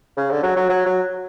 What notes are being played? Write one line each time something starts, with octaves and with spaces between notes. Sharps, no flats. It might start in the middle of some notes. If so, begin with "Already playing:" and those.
C#3
D3
F#3
F#3
F#3
F#3